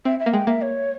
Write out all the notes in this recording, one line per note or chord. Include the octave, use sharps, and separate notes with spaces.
C4 E5
E5
A#3
G#3 G5
A#3 E5
C#5